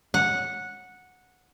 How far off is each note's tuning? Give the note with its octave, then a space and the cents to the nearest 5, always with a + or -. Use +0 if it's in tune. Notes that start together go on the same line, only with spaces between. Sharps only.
F#5 -10